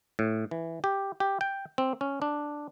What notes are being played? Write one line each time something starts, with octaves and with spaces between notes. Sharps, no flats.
A2
E3
G4
G4
G5
C4
C#4
D4